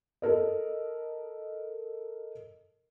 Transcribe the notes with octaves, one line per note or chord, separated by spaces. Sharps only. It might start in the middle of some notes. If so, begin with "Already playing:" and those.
A4 A#4 D#5